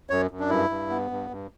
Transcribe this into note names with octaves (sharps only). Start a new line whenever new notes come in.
F#2 C#5
F#2
D4
G2 E4
G2
B3
G2
G2